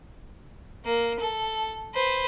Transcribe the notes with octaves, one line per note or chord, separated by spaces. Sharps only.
A#3
A4
B4 C5